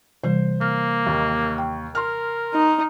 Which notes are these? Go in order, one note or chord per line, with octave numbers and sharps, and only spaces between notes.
C3 E3 G3 C5
A#3 F6
D#2 D#3
G5
A#4 C6 F6
D#4